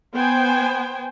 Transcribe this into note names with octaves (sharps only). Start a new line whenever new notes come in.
B3 C5 G5 G#5